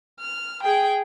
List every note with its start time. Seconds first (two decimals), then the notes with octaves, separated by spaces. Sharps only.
0.22 F6
0.63 G#4 G5